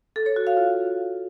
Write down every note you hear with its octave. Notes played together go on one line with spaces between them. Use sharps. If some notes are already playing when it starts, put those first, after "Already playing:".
A4
C#5
F#4
F5
F4